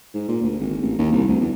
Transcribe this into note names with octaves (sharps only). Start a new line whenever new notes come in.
G#2
A#2
D2
G#1
A1
D#2
C2
D2
E2